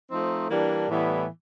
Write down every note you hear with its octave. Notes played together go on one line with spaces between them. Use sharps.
F3 A3 C4 D#4
E3 G3 A#3 D4
A2 E3 G3 B3